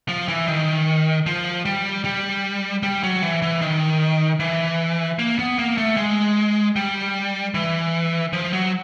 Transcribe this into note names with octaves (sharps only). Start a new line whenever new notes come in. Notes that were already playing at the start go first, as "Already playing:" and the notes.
F3
E3
D#3
F3
G3
G3
G3
F#3
E3
E3
D#3
E3
A#3
B3
A#3
A3
G#3
G3
E3
F3
F#3